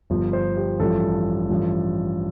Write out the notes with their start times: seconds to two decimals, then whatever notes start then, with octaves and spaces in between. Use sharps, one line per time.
0.10 G1 G2 F3
0.33 C5
0.57 G4
0.79 A1 G2 F3 A4
1.49 A1 G2 F3